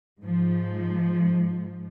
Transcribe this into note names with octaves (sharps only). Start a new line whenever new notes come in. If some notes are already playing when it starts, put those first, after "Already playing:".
G#2 F3